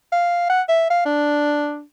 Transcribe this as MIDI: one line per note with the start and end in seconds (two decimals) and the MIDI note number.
0.12 0.47 77
0.50 0.62 78
0.68 0.86 76
0.90 1.02 77
1.06 1.82 62